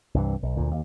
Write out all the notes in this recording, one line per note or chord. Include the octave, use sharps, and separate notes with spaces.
C2 G2 E3
B1
D2 A#2
D#2